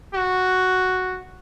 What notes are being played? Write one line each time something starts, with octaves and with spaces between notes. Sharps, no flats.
F#4